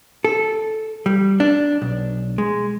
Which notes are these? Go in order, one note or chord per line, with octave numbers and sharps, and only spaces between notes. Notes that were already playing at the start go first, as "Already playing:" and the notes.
A4
G3
D4
B1
G#3